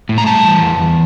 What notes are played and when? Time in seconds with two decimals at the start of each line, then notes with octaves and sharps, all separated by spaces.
0.09 A2
0.18 A#5
0.27 G3 A5
0.44 E3
0.62 E2
0.79 E2